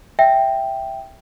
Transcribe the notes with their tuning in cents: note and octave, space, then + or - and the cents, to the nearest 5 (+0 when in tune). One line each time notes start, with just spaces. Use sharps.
E5 +0 G5 +0